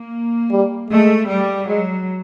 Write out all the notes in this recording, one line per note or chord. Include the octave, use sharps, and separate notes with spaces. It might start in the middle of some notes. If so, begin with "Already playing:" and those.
Already playing: A#3
G3
G#3 A3
G3
F#3 G#3